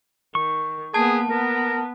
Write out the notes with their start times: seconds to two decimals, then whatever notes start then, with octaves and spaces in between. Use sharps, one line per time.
0.35 D#3 C#6
0.94 A#3 B3 G#4 A5
1.30 B3 A#4